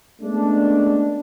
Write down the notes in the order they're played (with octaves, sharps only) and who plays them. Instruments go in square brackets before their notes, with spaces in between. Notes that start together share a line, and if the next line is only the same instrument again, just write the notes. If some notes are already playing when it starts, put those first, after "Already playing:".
[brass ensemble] G#3 A3 B3 C#4 D4